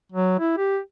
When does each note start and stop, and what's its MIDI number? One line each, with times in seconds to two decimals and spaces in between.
0.12 0.35 54
0.40 0.53 64
0.58 0.79 67